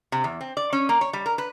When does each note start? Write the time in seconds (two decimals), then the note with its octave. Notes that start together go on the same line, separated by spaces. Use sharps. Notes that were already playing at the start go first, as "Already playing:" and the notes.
0.12 C3
0.24 E2
0.41 C4
0.57 D5
0.73 C#4
0.89 A#3
1.01 C#5
1.13 G3
1.26 A#4
1.38 B4